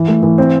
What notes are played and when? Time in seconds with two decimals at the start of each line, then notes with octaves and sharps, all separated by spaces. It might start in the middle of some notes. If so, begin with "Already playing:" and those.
Already playing: E3
0.08 A3
0.23 E3
0.38 C4